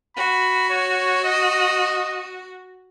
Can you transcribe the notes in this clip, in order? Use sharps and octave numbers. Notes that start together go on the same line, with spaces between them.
F#4 B5
C#5
D#5